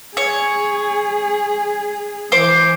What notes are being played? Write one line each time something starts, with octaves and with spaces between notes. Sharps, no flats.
G#4 C#5
E3 C5 D6